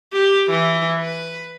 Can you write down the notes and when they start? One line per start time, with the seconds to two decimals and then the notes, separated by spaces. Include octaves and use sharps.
0.13 G4
0.50 E3
1.00 B4